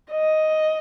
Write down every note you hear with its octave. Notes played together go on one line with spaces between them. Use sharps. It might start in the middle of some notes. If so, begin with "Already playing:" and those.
D#5